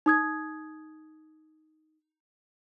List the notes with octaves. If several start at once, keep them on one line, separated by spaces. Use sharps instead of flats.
D#4 D#6 G#6